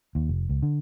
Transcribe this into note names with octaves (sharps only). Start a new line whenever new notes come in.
D#2
F1
C#2
D3